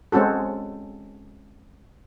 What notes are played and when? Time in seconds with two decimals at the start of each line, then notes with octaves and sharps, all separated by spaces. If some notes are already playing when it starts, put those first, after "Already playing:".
0.12 G#3 C4 C#4 F#4 A4